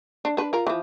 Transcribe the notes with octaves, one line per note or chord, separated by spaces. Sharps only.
D4
D4 B4
F4 A#4
E3 F3